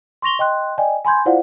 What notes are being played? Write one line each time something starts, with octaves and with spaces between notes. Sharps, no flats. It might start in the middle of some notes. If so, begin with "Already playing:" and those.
C6 C#6 A#6 F7 G7
D#5 G5 C6 F#6
D5 D#5 G5 G#5
G#5 B5 C6 G6 G#6
E4 F4 C5 D5 F5 F#5